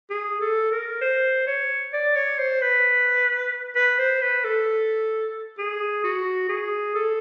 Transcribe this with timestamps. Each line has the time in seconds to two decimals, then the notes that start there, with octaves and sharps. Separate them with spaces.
0.10 G#4
0.41 A4
0.72 A#4
1.02 C5
1.47 C#5
1.93 D5
2.16 C#5
2.39 C5
2.62 B4
3.76 B4
3.99 C5
4.22 B4
4.44 A4
5.58 G#4
6.04 F#4
6.49 G#4
6.95 A4